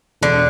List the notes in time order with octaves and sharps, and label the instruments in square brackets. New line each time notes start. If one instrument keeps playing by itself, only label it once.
[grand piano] E1 [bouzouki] D3